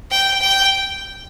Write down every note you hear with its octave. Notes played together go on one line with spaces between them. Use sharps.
G5
G5